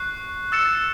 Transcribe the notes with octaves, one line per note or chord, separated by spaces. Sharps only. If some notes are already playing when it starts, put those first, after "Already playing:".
Already playing: C#6 F#6 C7
E6 A6 C#7 E7